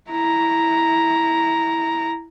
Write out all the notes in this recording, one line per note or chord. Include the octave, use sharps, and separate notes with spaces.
E4 A#5